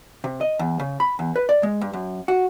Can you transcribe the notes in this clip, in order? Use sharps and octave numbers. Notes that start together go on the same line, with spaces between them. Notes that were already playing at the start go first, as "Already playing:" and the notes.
C3
D#5
E2
C#3
B5
E2
B4
D5
G#3
G2
F#2
F#4